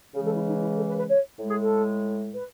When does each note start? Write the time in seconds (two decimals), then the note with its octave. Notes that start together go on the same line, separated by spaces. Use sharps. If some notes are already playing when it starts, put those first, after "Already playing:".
0.15 C#3 E3 G#3 G#4
0.25 A4
0.35 E4
0.46 D#4
0.61 E4
0.76 A4
0.88 B4
0.98 B4
1.08 C#5
1.39 A2 G#3
1.50 G#4
1.60 A4
2.33 B4